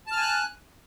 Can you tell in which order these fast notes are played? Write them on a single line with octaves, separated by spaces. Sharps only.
A5 F6 G#5 F#6